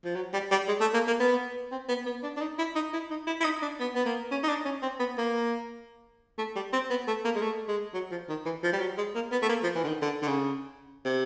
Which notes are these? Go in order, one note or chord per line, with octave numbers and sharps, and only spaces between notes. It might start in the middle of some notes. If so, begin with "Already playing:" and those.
F3
F#3
G3
G3
G#3
A3
A#3
A#3
B3
C4
B3
B3
D4
D4
D#4
E4
D#4
E4
D#4
E4
E4
D#4
D4
B3
B3
A#3
C#4
D#4
D4
C#4
C4
B3
A#3
A3
G3
C4
B3
A3
A#3
G#3
A3
G#3
F#3
F3
D#3
E3
F3
G3
F#3
G#3
A#3
B3
A3
A#3
F3
E3
D3
D#3
D3
D3
C#3
C3